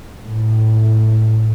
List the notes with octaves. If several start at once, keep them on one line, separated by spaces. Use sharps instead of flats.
A2